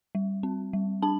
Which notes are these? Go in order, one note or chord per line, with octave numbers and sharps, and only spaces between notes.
G3
C4
G3
D4 A5